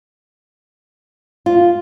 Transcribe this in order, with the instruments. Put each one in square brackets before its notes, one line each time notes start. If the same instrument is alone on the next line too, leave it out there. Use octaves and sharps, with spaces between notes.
[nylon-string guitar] F4